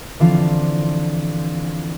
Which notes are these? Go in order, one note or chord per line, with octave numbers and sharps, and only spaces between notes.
D3 E3 F3 C4 D4 F4